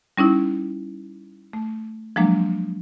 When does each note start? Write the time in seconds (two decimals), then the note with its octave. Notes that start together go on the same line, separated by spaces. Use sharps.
0.17 G3 C#4 D#4 E4
1.53 A3
2.16 F3 F#3 G#3 A#3 D4